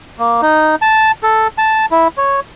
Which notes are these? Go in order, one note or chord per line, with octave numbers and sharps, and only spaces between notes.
A#3
D#4
A5
A4
A5
E4
C#5